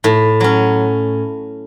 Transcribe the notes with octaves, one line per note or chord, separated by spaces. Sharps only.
A2
F#3 C#4